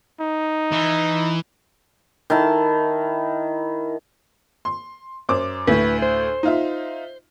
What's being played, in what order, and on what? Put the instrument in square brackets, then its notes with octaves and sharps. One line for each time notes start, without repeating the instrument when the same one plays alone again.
[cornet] D#4
[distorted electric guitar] E3
[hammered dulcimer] D#3 E4 A5
[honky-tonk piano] C6
F#2 C5 D6
[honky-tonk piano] D2 A2 [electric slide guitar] B4
[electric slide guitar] C5
[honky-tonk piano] D#4 F4 E5